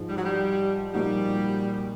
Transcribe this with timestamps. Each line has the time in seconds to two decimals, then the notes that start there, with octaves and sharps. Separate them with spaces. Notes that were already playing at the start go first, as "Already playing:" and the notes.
Already playing: G#2 F3 G#3
0.08 G3
0.16 F#3
0.24 G3
0.94 A#2 F3 G3 A#3 D#4 F#4